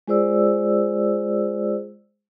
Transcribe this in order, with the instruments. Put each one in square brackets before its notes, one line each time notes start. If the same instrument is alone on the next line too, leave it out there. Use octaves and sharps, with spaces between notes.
[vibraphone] G#3 F4 G#4 C5 D5 E6